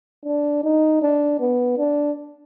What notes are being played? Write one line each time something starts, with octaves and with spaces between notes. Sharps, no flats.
D4
D#4
D4
B3
D4